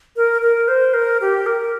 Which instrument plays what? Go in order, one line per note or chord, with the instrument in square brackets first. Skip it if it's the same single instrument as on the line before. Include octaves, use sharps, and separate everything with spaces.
[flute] A#4
A#4
C5
A#4
G4
A#4